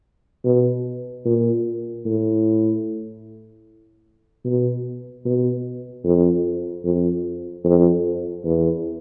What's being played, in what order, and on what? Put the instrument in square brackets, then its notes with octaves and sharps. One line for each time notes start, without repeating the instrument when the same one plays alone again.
[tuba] B2
A#2
A2
B2
B2
F2
F2
F2
E2